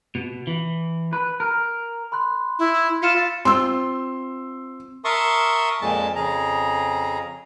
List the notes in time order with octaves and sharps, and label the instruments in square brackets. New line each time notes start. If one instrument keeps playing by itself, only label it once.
[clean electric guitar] B2
E3
B4
A#4
[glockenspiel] B5 C6 F#6
[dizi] E4
[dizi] F4 [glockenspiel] B6 C#7 E7
[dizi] F5 [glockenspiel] E6 A6
[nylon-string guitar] C4 F4 [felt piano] C6 E6
[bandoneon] A#4 E5 A5 C6 C#6 D#6
F2 A#2 G#3 A5
F2 C#3 G#4 A#5